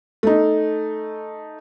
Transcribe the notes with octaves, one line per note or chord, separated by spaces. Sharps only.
A3 D#4